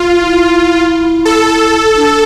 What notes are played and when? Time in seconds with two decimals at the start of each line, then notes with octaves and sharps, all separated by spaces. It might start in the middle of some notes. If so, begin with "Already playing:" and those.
Already playing: F4
0.18 E4
1.25 A4
1.97 D4